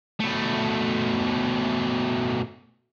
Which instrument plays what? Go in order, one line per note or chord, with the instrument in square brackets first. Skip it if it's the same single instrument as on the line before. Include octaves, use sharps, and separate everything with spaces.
[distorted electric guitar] B2 A3